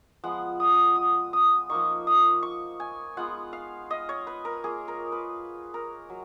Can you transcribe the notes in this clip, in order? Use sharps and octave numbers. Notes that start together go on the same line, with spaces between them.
F3 G#3 B3 F#5
D#6
D#6
D#6
D#6
F3 A#3 D#4 C#6
D#6
C#6
G#5
G#3 B3 F4 F#5
F5
D#5
C#5
B4
A#4
A#3 F4 G#4
A#4
B4
A#4
F#3